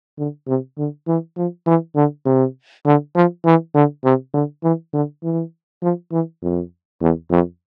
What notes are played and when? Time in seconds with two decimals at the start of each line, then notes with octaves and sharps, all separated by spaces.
0.19 D3
0.48 C3
0.78 D3
1.08 E3
1.37 F3
1.67 E3
1.96 D3
2.26 C3
2.86 D3
3.16 F3
3.45 E3
3.75 D3
4.04 C3
4.34 D3
4.63 E3
4.94 D3
5.23 E3
5.82 F3
6.12 E3
6.42 F2
7.01 E2
7.31 F2